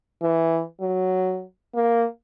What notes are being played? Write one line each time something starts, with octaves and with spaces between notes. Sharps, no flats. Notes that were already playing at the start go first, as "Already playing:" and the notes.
E3
F#3
A#3